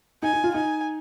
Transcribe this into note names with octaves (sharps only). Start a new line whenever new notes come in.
D#4 G#5
D#4
F4
D#4 G#5